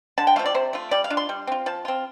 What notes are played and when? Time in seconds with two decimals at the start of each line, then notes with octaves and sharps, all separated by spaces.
0.18 D3 A5
0.27 G5
0.36 F3 A3 F5
0.46 D5
0.54 C3 C5
0.73 A3 F4
0.91 G3 D5
1.04 F5
1.10 D4 F4
1.17 C6
1.29 G3
1.47 C4 F4
1.66 F3 A5
1.85 C4 F4